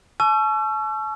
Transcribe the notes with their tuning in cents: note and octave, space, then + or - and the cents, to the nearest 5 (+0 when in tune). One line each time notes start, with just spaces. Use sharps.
A5 -40 C#6 +15 E6 +40